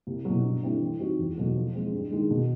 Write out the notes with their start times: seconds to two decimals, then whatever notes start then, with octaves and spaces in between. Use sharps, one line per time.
0.07 C2
0.25 B2 F#3
0.44 G2
0.62 D3 G3 C4 E4
0.81 E3
0.99 G3 C4 D#4 F#4
1.19 E2
1.36 B2 F#3 A3
1.55 F3
1.74 G#3 C4
1.92 G2
2.11 D#3 G#3
2.30 B2